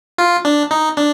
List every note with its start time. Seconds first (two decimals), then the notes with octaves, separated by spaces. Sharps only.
0.18 F4
0.45 D4
0.71 D#4
0.97 D4